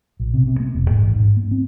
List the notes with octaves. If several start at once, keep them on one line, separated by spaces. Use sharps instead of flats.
A#1
C3
C3
A#3
E1
G#2
A1
G#2
A#3
C4